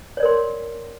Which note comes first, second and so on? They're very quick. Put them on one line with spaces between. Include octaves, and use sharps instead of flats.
C#5 D5 A#4 C6